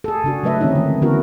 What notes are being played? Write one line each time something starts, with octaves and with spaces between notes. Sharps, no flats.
G#4 A4
C#3 D4 F#4
F#3 A3 B4 D#5 E5
D3 E3 C4 C#4 D#4
D#3 G#3
D3 B3 C#4 E4 F#4 A#4